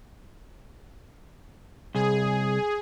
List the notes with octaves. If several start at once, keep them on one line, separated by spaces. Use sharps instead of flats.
C2 G#4